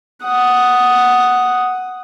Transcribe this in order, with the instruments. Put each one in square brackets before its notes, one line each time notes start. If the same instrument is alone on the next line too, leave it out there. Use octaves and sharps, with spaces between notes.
[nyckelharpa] F#5 D#6